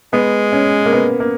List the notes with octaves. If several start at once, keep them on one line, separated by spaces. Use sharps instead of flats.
G#3 B3
C#4
A#3
B3
A#3